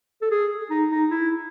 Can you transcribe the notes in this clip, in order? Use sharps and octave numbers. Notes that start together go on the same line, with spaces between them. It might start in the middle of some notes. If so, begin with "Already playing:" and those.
A4
G#4
D#4
D#4
E4